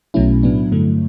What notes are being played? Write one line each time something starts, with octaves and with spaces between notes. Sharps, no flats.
B1 B2 F#3 A3 C#4 E4
A2 F#3 B3 D4
G2 D3 F#3 A3